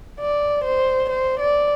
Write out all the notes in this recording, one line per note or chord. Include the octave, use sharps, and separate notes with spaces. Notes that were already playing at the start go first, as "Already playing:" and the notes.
D5
C5
C5
D5